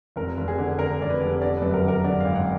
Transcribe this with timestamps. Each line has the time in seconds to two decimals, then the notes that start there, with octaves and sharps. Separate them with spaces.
0.16 F1 A#4
0.37 F1
0.48 G#4
0.59 D3
0.79 D3 A#4
1.00 F1 D5
1.10 B4
1.21 F1
1.42 D3 D5
1.57 B4
1.62 F#2
1.67 B4
1.74 A#4
1.84 D3 A#4
2.04 D3 D5
2.20 G#1 F5
2.35 F#5